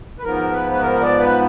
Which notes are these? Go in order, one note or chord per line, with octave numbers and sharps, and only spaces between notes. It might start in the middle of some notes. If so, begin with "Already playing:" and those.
B4
G#2 F3 B3 A#4
B4
B4
A#4
D5
B4